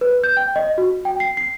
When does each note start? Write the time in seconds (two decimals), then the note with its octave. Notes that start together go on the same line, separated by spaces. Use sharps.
0.01 B4
0.24 G6
0.37 G5
0.56 D#5
0.78 F#4
1.05 G5
1.20 C7
1.37 C7